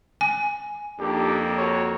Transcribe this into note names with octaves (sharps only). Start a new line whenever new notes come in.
G#5
F2 A#3 D4 D#4 G4 A4
F#4 A#4 C#5